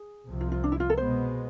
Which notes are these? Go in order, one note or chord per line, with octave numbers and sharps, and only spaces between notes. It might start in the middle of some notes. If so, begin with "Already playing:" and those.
Already playing: G#4
C2 C3 F3
F4
F4
D4
E4
F4
A4
B2 G#3 B3 C5